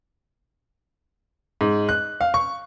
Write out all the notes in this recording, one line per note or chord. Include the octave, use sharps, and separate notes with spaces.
G#2
F#6
F5
C#6